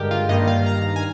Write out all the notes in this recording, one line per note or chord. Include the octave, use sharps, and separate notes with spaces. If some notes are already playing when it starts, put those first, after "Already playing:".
Already playing: G2 D3 G#3 G4 A#4
F4
G2 D#3 A#3 D#5
F5
A#5
G#5